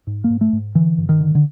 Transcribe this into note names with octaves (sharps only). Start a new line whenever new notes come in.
G#2
A#3
G#2
A3
G#2
D3 E3
G2
D#3
D3
D3